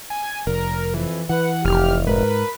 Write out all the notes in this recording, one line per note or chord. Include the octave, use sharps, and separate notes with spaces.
G#5
F1 A#4
F2 E3
E3 B4 F#5
F1 G4 F6
G#2 A#4 B4